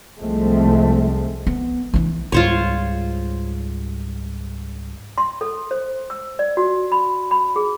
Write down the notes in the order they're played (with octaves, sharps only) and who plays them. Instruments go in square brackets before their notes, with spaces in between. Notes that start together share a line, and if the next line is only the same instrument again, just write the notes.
[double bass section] C2 F3 G#3 A3 C4
[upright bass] B3
E3 D4
[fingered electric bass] C#2 G#2 G3 [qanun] F4 C5 C#5
[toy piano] C6
A4
C5
E6
D5
F#4
B5
B5
G#4